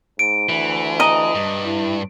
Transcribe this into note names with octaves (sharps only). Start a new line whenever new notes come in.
G#2 D7
D2 E3
D#5 A#5
G2
E4